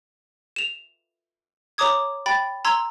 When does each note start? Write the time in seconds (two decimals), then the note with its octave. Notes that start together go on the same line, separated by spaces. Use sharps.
0.56 E7 F7
1.78 C#5 A#5 D6 D#6 G#6
2.26 G5 B5 A6
2.65 A#5 C6 E6 G#6